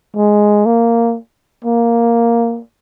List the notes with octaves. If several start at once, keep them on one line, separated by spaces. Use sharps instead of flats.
G#3
A#3
A#3